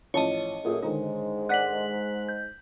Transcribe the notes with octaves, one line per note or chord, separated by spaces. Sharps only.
A1 F3 C#5 D#5 A5
F#2 A#2 A3 G#4
G#2 D3 D#3 G#3 D#4
D5 F#5 G#5 F#6 B6 F#7
G6